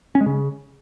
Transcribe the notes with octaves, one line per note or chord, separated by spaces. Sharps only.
C#4
G#3
C#3